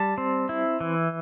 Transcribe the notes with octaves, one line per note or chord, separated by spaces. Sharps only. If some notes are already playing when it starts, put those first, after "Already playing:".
Already playing: G3 A5
C4
E4
E3